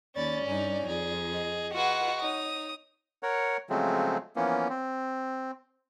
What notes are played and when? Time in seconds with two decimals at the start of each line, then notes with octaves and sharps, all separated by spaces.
0.15 D#2 C#4 D5 B5 A6
0.46 G2 D#4 G#5
0.87 F2 G#4
1.33 D#5
1.73 F4 F#4 G#4 B4 F#5
2.21 D#4 C#5 D#6
3.23 A#4 C#5 F#5
3.70 C#3 F3 F#3 G#3 A3 C4
4.36 E3 F3 A#3 B3 C#4
4.69 C4